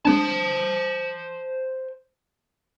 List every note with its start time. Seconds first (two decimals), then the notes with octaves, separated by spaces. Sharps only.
0.05 G#3 C4 D4 C5 A5